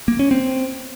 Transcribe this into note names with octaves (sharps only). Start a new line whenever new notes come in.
A#3
C#4
C4